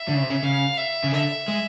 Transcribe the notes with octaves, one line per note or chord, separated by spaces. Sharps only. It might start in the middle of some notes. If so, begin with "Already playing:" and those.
Already playing: E5
D3
C#3
C3
C#3
C#3 F5
E5
C#3
D3 E5
G#3